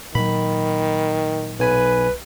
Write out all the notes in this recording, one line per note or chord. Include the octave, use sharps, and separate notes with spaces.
A#2 D#3 F#3 B5
B1 B4 G#5 B5